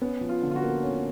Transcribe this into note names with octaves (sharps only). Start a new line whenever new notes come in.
B3 C#4
F3
F4
D3
F4
F#4
A#3
C#4